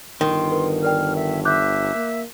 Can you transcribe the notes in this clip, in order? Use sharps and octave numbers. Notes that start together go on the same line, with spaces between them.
G1 D#3 C6
A#4 B4
A#4 D5 G5 F6
E5
E5 D6 F#6 G6
A#3